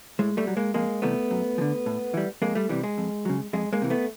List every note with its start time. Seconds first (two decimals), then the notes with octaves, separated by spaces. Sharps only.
0.19 A2 G#3
0.37 G3 A3
0.47 F#3
0.57 G#3 A#3
0.74 F2 G#3 A#3
1.02 C3 E3 G3 A3 B3
1.31 F#2
1.58 F3
1.61 D3
1.86 A2
2.14 E3 G3
2.42 F2 G#3 A#3
2.55 G3 A3
2.69 C3 E3 G3
2.84 G#3
2.98 F2
3.25 C#3 F#3
3.53 F2 G#3
3.73 G#3 A#3
3.82 C3 E3
3.90 A3 B3